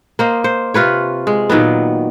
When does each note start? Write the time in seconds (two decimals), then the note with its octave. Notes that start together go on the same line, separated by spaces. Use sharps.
0.19 A#3 C5 D#5
0.44 C5
0.74 C3 F4 B4 C#5
1.27 G#3
1.50 A#2 D#3 F#3 B3